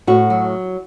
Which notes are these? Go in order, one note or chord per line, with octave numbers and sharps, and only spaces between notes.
A2 F#4
F#3